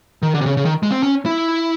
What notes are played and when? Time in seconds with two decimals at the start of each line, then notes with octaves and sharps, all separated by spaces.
0.22 D#3
0.34 D3
0.41 C3
0.46 C#3
0.57 C#3
0.65 D#3
0.83 G#3
0.91 C4
1.03 C#4
1.26 E4